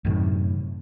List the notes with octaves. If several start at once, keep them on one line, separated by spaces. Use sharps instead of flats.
F#2 A2 C3 D#3